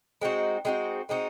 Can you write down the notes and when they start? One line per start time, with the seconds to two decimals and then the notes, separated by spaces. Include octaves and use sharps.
0.22 G#3 C4 D#4 F#4
0.65 G#3 C4 D#4 F#4
1.09 G#3 C4 D#4 F#4